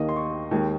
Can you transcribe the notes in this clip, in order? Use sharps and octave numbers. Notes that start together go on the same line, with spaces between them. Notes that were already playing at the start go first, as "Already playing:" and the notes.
Already playing: D#2 D#3 A#3 D#5
C6
C#6
D#2 D#3 G#3